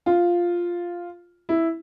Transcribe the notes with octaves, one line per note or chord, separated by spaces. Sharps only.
F4
E4